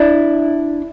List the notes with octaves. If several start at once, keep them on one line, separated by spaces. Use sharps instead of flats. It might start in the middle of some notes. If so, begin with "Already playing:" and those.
Already playing: D4 E4